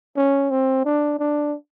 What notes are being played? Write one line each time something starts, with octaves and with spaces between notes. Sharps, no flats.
C#4
C4
D4
D4